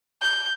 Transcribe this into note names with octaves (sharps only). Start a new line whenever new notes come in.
G6